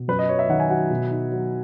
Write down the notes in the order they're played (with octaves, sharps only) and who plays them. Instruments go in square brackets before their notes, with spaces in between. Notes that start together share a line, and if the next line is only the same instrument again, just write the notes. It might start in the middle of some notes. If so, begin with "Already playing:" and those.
Already playing: [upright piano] B2
[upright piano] F#2 [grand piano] B4
[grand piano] D#5
[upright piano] F#3 [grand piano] C#5
[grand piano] E5
[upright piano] D#3 [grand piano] F#5
[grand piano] G#5
[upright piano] F#3 [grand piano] F#5
[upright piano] B2
D#4
F#3